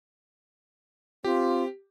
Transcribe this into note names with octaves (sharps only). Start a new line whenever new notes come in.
C4 F4 G4